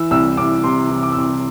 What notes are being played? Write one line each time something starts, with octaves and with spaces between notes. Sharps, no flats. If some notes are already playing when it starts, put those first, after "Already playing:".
Already playing: E3 E6
C2 E6
C2 D6
C3 C6
E3
D6
E6
C2 D6